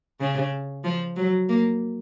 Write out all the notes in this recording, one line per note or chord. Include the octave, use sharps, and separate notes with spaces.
C#3
F3
F#3
A#3